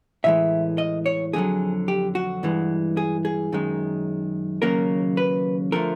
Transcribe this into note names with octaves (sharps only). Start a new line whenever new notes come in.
A2 E3 G#3 E5
D#5
C#5
F2 D3 F#3 G#4
G4
F#4
G2 E3 G#3
G#4
G#4
F#2 D#3 G#3
D#2 C#3 F#3 A#3 A#4
B4
D3 F3 A3 A#4